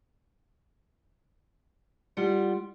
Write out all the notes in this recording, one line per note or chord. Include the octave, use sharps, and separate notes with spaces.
G3 F4 F#5